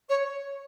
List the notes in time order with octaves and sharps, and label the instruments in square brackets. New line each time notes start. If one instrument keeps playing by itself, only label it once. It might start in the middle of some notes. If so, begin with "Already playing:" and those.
[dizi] C#5